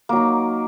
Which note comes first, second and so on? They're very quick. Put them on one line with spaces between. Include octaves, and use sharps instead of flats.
A#3 F#3 D#4